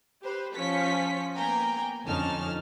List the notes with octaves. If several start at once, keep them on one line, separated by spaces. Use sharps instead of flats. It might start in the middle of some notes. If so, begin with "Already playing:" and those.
G4 B4 C5
F3 C#4 B6 C#7
A#3 B3 G5 G#5 A#5
F2 D3 C#4 D#4 A5 F6